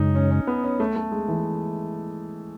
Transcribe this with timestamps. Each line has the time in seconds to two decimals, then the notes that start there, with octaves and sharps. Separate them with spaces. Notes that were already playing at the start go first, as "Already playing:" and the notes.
Already playing: F#2 C#3 G#3 C#4 D#4
0.15 C#4
0.31 C#4
0.47 B3
0.64 C#4
0.80 A3
0.96 A3
1.12 G#3
1.28 E3